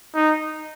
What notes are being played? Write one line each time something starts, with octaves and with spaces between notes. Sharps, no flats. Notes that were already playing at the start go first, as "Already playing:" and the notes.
D#4